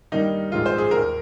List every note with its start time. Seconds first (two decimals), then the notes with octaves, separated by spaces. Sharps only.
0.12 G2 D#3 G3 A#3 D#4
0.52 A#1 G#2 D#3 G#3 F4
0.66 C5
0.78 G#4
0.91 D#2 D#3 A#3 A#4